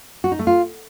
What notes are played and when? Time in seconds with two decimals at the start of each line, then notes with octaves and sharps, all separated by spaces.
0.24 F#4
0.32 D#4
0.39 A3
0.47 F4